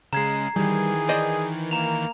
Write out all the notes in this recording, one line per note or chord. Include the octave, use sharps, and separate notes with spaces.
C#3 G#3 A#5 G#6 C7
D#3 E3 G3 G#4
C5 D5 D#5
A#3 A#5 F7